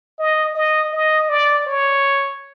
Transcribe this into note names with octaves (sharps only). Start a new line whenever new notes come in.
D#5
D#5
D#5
D5
C#5